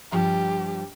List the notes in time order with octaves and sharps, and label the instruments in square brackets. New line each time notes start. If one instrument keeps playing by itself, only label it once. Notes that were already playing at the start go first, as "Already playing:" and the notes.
[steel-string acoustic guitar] G2 F3 G3 [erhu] G4